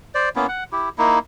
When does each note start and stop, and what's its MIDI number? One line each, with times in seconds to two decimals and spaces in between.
0.15 0.29 72
0.15 0.29 74
0.36 0.47 58
0.36 0.47 59
0.36 0.47 61
0.36 0.47 64
0.49 0.64 78
0.72 0.89 64
0.72 0.89 67
0.98 1.19 58
0.98 1.19 63
0.98 1.19 64